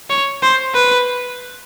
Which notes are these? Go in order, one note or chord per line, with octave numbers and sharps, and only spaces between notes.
C#5
C5
B4